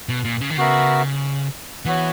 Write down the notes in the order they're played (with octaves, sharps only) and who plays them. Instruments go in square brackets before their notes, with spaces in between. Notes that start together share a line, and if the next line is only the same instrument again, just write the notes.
[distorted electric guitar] B2
A#2
C#3
D#3
[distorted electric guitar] C#3 [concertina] B3 F#4 A#4 E5
[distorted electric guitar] E3 [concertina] B3 F#4 C#5